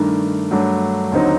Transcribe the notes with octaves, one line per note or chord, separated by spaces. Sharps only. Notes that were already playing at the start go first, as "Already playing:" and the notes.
Already playing: G2 D#3 A3 D4 A#4
G2 F#3 A3 D4
D#2 D3 F#3 C4 D#4